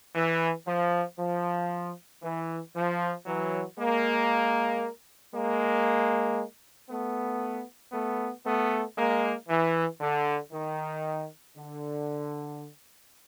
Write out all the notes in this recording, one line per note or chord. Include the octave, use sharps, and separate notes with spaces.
E3
F3
F3
E3
F3
E3 F#3
G#3 A#3
G#3 A#3
A3 B3
A3 B3
A3 B3
G#3 A#3
E3
D3
D#3
D3